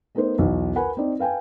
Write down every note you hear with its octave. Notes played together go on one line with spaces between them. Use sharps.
A3 B3 D#4 A#4 C5
B1 E2
A#4 B4 F#5 G#5 B5
C4 D#4 D5
B4 F5 G5 G#5